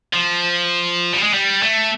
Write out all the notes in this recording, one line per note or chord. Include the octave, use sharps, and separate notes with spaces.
F3
G3
G#3
G3
A3